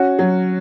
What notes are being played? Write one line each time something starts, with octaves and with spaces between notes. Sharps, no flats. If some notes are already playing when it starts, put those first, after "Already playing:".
Already playing: C#4 F#4
F#3